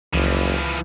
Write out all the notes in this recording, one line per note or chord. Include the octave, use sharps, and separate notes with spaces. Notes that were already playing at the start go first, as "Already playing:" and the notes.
F#1 C#2 E3 F3